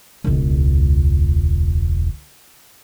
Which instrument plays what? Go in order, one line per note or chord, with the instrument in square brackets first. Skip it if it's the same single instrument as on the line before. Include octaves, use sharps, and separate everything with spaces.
[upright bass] E1 C#2